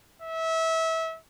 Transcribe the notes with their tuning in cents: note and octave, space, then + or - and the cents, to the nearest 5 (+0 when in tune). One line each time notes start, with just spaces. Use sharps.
E5 -25